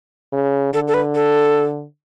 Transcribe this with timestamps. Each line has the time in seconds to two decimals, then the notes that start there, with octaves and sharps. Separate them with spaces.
0.32 C#3
0.73 D3 A4
0.88 A4
0.94 B4
1.15 A4